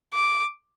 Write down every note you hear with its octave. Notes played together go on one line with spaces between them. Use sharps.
D6